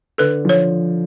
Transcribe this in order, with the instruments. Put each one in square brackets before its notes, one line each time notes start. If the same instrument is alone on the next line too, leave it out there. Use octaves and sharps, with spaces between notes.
[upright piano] D3 [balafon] A4 B4
[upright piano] F3 [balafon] C#5